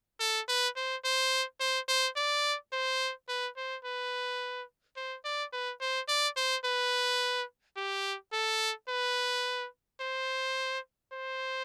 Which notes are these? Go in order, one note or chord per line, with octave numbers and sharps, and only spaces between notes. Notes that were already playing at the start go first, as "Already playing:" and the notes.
A4
B4
C5
C5
C5
C5
D5
C5
B4
C5
B4
C5
D5
B4
C5
D5
C5
B4
G4
A4
B4
C5
C5